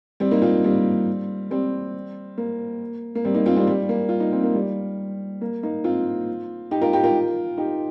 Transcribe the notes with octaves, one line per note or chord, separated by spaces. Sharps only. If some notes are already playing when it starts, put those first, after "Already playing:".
G3 C4
A#3 D#4
C4 F4
G3 C4
G3 C4
A#3
A#3
G3 C4
A#3 D#4
C4 F4
G3 C4
G3
A#3
F4
D#4
C4
A#3
G3
A#3
A#3 D#4
C4 F4
D#4 G4
F4 A#4
D#4 G4
F4 A#4
D#4 G4